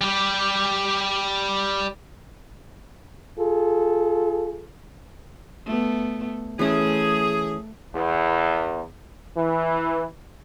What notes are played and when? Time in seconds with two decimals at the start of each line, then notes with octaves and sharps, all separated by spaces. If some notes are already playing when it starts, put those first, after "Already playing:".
0.01 G3 G4
3.38 F4 G#4 A4
5.66 A3 B3
6.59 E3 A3 C#4 G#4
7.94 E2
9.37 E3